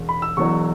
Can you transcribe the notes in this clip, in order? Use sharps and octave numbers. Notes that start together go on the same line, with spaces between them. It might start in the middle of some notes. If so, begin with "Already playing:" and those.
Already playing: E1 E2
B5
E6
E1 E2 B2 F#3 C#6